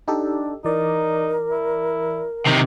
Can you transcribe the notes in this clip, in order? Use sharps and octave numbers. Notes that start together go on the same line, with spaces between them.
D4 D#4 G4 A4
E3 D#4 A#4 D5
E4
C3 D#3